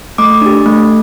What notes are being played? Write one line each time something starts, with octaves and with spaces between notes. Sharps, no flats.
A3 D6
D4 G4
A3